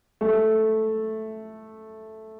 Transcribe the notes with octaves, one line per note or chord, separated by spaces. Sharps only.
A3